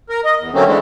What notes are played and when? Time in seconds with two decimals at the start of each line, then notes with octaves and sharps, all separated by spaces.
0.10 A#4
0.25 D#5
0.39 E2
0.54 D3 F#3 A3 A#3 C4 C#4
0.66 D3 E3 G#3 A3